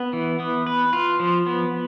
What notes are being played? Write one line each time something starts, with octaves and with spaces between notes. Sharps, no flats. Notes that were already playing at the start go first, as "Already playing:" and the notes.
Already playing: B3
E3
B3
B4
F4
F3
B3